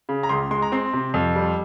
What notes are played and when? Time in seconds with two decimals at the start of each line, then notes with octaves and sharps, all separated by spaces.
0.09 C#3
0.23 A#5
0.29 C#2 C6
0.51 G#3 C6
0.62 A#5
0.72 C4 C6
0.94 C3
1.14 F2
1.36 G3